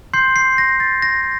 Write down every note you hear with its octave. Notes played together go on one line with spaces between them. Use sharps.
C6 G6 C7
C7
A#6
A6
A#6